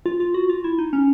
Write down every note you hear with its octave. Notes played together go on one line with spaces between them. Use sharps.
F4
F4
F#4
F4
E4
D#4
C#4